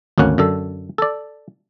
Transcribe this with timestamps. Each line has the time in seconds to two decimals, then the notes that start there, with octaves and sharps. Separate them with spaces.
0.18 G#1 D2 A#3 C#4 F#5
0.38 F#2 D3 A4
0.98 A4 D5